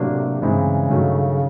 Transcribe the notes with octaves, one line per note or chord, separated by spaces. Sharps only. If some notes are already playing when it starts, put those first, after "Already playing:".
Already playing: A2 C3 F#3 A#3 D4
G2 C#3 E3 G#3 C4 D#4
G2 D#3 F#3 A3 C#4